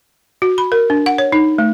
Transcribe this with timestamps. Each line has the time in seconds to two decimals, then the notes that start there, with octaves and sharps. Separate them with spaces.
0.42 F#4
0.58 B5
0.72 A#4
0.90 D4
1.06 F#5
1.18 C#5
1.32 D#4
1.58 A3